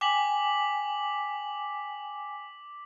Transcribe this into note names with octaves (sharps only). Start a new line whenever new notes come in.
G5 G#5 D6 B6 F#7